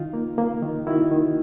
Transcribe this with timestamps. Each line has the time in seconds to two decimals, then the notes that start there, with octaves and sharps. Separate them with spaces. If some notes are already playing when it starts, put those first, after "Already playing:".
Already playing: D#3 D#4 F4
0.13 A#3
0.38 A#3
0.62 D#3
0.86 D#3 E4 F#4
1.11 D#3